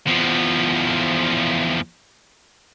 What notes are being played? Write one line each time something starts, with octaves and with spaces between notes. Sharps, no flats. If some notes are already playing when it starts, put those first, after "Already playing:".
E2 F3